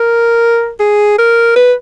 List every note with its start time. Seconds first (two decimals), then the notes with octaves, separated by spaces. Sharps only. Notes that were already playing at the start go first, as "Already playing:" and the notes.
Already playing: A#4
0.80 G#4
1.18 A#4
1.56 B4